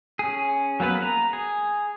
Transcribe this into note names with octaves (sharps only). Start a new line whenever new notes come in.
C#4 G#4
F#3 A#3 B3 B4
A#5
G#4